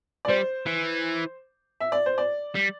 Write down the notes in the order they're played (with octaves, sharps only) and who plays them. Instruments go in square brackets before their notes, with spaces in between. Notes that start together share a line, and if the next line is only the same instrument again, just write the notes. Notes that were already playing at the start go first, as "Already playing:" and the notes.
[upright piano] D5
[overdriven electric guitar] G3 [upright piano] C5
[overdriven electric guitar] E3
[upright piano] E5
D5
C5
D5
[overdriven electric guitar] G3